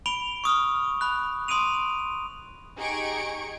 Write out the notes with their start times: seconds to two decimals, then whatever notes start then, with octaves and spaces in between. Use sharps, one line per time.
0.06 B5 D7 F7 G7
0.44 C#6 D#6 F6
1.01 B5 F#6
1.48 C6 D#6 D7 D#7 F7
2.77 D#4 G4 G#4 C#6 G#6 D7